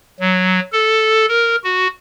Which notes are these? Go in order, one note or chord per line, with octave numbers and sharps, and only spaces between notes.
F#3
A4
A#4
F#4